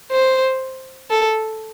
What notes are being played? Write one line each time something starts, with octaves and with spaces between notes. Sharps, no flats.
C5
A4